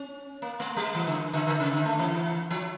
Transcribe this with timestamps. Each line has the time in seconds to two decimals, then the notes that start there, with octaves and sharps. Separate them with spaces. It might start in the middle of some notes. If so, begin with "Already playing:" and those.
Already playing: C#4
0.42 A#3
0.60 A3
0.77 G3
0.95 E3
1.07 D3
1.33 D3
1.47 D3
1.60 C#3
1.72 D3
1.85 A3
1.99 E3
2.51 F3